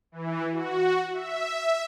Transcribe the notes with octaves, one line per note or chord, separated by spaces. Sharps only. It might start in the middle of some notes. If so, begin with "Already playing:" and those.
E3
F#4
E5